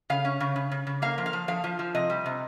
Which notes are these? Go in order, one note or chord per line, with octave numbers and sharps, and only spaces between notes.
C#3 F5
C#4
C#3
C#3
C#3
C#3
A#3 F5
F3
F5
F3
F3 F5
F3
F3
C3 D#5
G3
C3